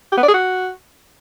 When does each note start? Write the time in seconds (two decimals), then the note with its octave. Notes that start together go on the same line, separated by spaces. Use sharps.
0.12 G4
0.17 B3
0.23 D5
0.28 G#4
0.34 F#4